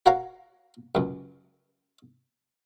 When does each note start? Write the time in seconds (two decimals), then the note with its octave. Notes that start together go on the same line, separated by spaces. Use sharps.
0.06 F#4 A#4 C#5 F5 F#5 A#5
0.95 C#2 F#2